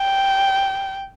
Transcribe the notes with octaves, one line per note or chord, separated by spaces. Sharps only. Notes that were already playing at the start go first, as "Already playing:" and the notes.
Already playing: G5